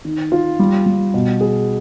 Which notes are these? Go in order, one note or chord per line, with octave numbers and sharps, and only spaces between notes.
D#3
F4
G3
G3
B2
G#4